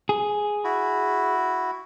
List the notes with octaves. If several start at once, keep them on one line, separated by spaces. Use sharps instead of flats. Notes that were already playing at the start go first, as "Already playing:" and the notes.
G#4
E4 F#4